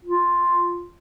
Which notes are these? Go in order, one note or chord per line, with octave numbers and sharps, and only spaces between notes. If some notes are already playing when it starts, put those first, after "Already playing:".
F4